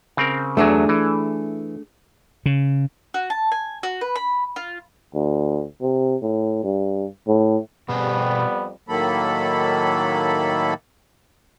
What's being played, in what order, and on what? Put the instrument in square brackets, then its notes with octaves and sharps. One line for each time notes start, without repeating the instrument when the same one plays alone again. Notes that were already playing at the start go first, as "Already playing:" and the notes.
[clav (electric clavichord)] C#3 C4 A#4
[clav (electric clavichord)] E2 F#3 [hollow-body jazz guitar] A3 D4 G#4
[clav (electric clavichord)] E3
[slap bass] C#3
[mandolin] F#4
A5
G#5
F#4
B4
B5
F4
[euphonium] D2
C3
A2
G2
A2
[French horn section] F2 G3 [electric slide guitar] B2 G#4 A4 [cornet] B3
[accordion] A2 D#3 F#3 A#3 A4 B5